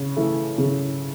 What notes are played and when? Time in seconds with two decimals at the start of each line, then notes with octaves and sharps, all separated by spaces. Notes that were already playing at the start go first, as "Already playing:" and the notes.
Already playing: C#3
0.17 E3 A3
0.58 C#3